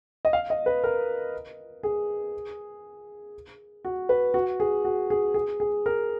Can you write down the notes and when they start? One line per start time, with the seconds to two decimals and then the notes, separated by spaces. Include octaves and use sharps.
0.25 D#5
0.33 F5
0.50 D#5
0.66 B4
0.84 A#4
1.83 G#4
3.85 F#4
4.09 B4
4.34 F#4
4.60 G#4
4.85 F#4
5.10 G#4
5.34 G#4
5.60 G#4
5.86 A#4